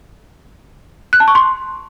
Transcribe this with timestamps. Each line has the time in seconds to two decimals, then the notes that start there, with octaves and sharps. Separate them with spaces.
1.13 F#6
1.20 A5
1.28 C#6
1.35 C6